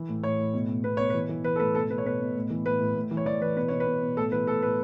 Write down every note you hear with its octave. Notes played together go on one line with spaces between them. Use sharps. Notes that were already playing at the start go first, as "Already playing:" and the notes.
Already playing: E3
A2
A2 C#5
A2
B2
B2
B2 B4
B2 C#5
E3 B4
E3
E3 B4
A4
A2 B4
B2 A4
B2 B4
C#5
B2 B4
B2
A2
E3
A2 B4
A2
A2
E3
C#5
E3 D5
E3 B4
B2 B4
B2 C#5
B4
B2
B2
A2 A4
E3 B4
A2 A4
A2 B4